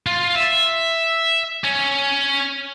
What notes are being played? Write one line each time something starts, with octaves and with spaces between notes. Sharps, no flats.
F4
E5
C#4